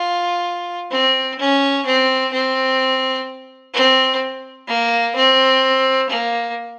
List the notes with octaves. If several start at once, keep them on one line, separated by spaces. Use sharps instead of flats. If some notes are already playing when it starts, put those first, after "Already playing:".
Already playing: F4
C4
C#4
C4
C4
C4
A#3
C4
A#3